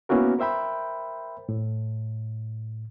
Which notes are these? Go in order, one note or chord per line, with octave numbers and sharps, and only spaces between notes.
A#3 B3 C#4 E4 F#4 A#4
A#4 C5 E5 G5 B5
A2